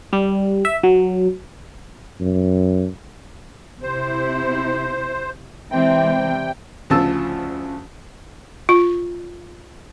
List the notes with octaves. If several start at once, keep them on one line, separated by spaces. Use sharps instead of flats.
G3
E5
F#3
F#2
C3 E4 C5
C3 E3 G#3 C4 E4 C5 D5 G5
D2 C#3 F3 F4 A5 E6
F4